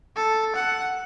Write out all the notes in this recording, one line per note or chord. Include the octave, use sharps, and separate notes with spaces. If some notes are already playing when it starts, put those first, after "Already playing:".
A4
F#5